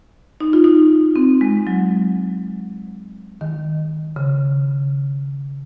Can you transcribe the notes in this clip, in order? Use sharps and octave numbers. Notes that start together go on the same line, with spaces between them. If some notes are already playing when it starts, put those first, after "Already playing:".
D#4
F4
D#4
C4
G#3
F#3
D#3
C#3